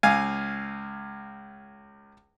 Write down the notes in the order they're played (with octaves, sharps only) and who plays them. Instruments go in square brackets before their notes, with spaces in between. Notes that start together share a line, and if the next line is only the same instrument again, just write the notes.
[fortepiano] C#2 F5 G#5